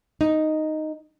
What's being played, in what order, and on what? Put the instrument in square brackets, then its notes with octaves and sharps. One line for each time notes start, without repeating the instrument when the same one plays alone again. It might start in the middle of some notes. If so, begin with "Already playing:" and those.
[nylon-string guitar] D#4